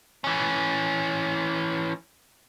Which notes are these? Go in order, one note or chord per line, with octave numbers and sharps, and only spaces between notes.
E3 C#4